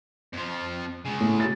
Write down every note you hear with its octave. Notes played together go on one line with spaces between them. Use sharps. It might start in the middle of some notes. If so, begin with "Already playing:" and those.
F2 F3
C#3 G#3
A2
F#4 A6